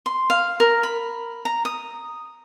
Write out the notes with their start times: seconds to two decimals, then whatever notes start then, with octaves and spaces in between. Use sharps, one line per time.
0.06 C6
0.30 F5
0.60 A#4
0.83 B5
1.45 A#5
1.65 D#6